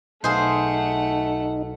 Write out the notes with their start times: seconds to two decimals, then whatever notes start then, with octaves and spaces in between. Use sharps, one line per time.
0.24 B1 A3 D#4 G#4 B4 C5 F5 F#5